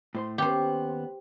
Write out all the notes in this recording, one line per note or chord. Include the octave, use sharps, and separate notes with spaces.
A2 C5 C6
D#2 B3 C#4 G4 C5